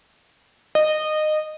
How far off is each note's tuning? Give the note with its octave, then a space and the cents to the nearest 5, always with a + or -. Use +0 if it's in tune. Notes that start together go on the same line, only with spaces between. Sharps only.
D#5 -20